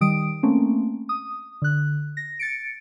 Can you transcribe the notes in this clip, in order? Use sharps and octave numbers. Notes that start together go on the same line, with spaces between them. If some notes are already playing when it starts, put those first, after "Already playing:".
D#3 G3 D#6 D7
A3 A#3 C4 C#4
D#6
D3 F#6
A#6
A6 C#7 D7